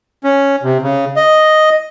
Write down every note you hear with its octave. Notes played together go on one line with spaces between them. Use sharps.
C#4
C3
C#3
D#5